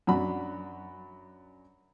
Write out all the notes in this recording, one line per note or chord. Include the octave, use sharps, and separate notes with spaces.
F#2 D4 F#4 B5